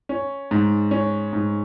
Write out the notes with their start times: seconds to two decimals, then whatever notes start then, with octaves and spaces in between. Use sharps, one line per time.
0.09 C#4
0.51 G#2
0.91 C#4
1.33 G#2